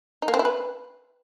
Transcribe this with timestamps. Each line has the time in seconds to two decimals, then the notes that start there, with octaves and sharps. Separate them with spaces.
0.22 D#4
0.28 A#3
0.34 C4
0.39 E4
0.45 B4